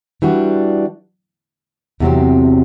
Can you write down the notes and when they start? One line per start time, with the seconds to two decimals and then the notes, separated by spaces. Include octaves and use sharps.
0.22 E3 G3 D4 F#4
2.00 E2 C3 F#3 C4 G4